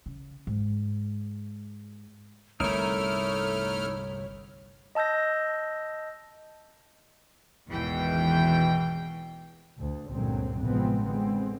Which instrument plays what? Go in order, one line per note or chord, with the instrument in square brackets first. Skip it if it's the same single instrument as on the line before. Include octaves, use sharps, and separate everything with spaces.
[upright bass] C#3
G#2
[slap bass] G1 C2 [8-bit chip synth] A3 F6 [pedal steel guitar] D#4 E4 A#4 [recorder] C#5
[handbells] D#5 A5 E6 G6 A#6
[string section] G#1 E2 B2 E3 G5
[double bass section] D2
C#2 G2 A#2 D3 F#3 C4
A1 C3 F3 G#3 B3 C4
D3 G#3 B3 C4